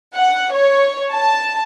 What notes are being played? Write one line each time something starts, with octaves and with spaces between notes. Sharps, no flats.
F#5
C#5
A5